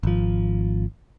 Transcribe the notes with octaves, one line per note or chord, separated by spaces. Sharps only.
G#1 F3